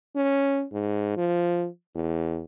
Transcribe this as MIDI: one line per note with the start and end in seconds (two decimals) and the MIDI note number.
0.16 0.64 61
0.73 1.13 44
1.17 1.67 53
1.95 2.44 40